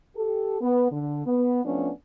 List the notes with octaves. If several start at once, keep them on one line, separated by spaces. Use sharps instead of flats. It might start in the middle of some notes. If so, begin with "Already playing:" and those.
G4 A4
B3
D3
B3
F3 A3 B3 C#4 D4